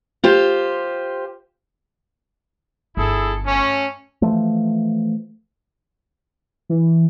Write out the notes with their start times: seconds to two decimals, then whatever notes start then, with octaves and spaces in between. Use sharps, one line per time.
0.23 F4 G4 C5
2.97 G1 E4 G#4 A4
3.47 A3 C#4
4.22 E3 F3 A3
6.69 E3